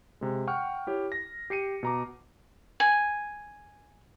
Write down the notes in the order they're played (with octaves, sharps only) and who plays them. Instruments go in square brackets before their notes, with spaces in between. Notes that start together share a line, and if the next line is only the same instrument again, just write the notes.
[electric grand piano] C3 G#3
F#5 G5 C#6 F6
E4 G4 C#5
A#6
G4 C7 C#7 D#7
B2 A#5 D6
[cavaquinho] G#5